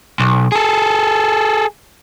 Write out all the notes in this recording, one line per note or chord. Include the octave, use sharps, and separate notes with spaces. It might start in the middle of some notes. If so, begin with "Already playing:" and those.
B1
G#4 A4